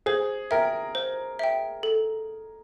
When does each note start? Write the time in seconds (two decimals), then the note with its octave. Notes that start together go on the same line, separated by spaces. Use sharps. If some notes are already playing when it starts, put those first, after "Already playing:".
0.06 G#4 C5
0.51 A#4 E5 G5
0.95 C5
1.39 E5 G5
1.83 A4